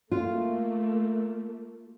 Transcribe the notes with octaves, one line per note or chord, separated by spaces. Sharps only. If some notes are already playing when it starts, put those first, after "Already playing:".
A3 A#3 F4